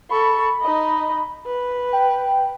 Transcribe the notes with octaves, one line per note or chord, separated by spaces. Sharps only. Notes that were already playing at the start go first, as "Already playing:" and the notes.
A4 B5 C#6
D#4 D#5
B4
G5